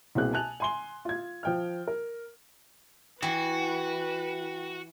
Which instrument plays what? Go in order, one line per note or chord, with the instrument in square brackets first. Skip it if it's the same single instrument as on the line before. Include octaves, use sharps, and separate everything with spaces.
[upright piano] C2 B2 A#3 C4 G#4 F#6
G#5 A5 F#6 F7
G#5 C6 G7
F4 G#6
F3 G5 F6
A#4
[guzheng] E3 [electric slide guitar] F#4 [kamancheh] B4 [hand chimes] G5